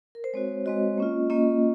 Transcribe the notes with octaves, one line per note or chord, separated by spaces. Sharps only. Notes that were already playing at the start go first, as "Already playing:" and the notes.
A#4
C5
G#3 C4 F#4 C#5
G#3 C4 F#4 D#5
A#3 C#4 F4
A#3 C#4 F4 D#5